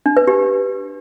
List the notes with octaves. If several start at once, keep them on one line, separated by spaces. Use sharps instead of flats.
D4
B4
G4